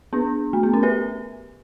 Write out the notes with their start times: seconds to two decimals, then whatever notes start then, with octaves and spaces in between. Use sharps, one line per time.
0.13 B3 D4
0.53 A3
0.63 B3
0.74 C#4
0.83 G4 B4